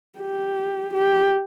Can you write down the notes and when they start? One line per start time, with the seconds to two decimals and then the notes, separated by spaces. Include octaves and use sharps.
0.19 G4
0.94 G4